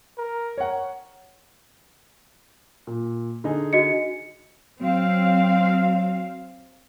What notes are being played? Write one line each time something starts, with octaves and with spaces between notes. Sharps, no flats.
A#4
C#5 F#5
A#2
D3 D#4 G#4
F#4 D#5 C#7
F#3 C4 F5